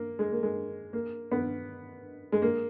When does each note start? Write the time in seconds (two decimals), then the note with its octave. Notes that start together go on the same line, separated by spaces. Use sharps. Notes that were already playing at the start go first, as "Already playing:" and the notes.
Already playing: A#3
0.19 G#3
0.32 A#3
0.43 G#3
0.93 A#3
1.31 B3
2.32 G#3
2.42 A#3